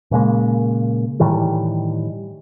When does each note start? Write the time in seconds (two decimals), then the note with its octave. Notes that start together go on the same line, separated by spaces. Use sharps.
0.11 A#2 C#3 G#3 A#3
1.20 A2 D#3 E3 G3